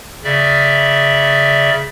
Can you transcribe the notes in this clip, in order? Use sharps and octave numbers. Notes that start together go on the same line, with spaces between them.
C#3 D5 E5